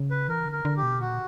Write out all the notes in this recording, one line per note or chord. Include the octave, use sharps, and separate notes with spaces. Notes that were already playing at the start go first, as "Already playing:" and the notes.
Already playing: C#3
B4
E3 A#4
D3
A#4
D3
G4
B2
A#2 F#4